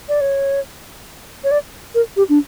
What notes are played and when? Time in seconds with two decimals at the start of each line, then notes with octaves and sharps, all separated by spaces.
0.09 D5
0.21 C#5
1.44 C#5
1.51 D5
1.95 A#4
2.17 G4
2.29 D4